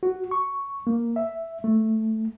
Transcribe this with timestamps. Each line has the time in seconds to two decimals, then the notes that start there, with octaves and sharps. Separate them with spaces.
0.03 F#4
0.31 C#6
0.87 A#3
1.16 E5
1.64 A3